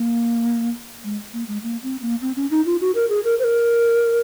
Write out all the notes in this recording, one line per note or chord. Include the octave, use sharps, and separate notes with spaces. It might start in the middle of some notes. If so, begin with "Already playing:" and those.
Already playing: A#3
G#3
A#3
G#3
A#3
C4
A#3
C4
C#4
D#4
F4
F#4
A#4
G#4
A#4
C5
A#4